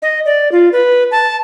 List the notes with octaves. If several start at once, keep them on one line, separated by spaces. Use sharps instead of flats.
D#5
D5
F4
B4
A5